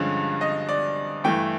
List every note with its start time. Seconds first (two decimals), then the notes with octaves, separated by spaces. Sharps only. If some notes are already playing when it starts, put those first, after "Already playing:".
Already playing: G2 D3 F3 G#3 C#4
0.41 D#5
0.69 D5
1.24 G2 E3 A3 G5